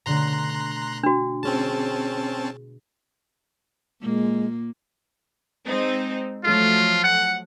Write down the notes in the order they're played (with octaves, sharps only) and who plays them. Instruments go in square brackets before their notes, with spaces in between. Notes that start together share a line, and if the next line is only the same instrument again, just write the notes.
[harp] B2 D3 A3 [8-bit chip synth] A#5 C6 F#6
[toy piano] D4 F#4
[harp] G#3 [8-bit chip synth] C4 C#4 A5
[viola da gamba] A#2 A#3 [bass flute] G#3
[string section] G#3 C4 D#4
[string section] F3 F#3 A3 [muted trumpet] F4
[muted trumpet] F#5